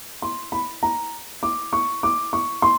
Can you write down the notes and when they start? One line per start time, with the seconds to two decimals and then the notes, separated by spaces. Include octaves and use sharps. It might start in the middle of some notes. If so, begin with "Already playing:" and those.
0.22 C6
0.52 B5
0.83 A#5
1.43 D6
1.73 C#6
2.03 D6
2.33 C#6
2.62 C6